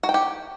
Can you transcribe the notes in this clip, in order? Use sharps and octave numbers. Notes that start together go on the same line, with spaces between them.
F#4
G5
G4